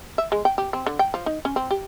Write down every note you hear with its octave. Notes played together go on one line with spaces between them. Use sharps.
E5
G#3
G5
G4
C4
D3
G5
F3
D#4
C#4
C4
G4